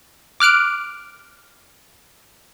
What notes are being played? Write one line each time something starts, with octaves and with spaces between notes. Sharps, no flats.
D6 F6 F#6 D7